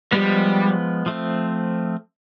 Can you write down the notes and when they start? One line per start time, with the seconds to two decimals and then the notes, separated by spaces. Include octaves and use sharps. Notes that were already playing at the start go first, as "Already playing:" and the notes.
0.12 F3 G3 G#3 B3
1.06 F3 A3 C4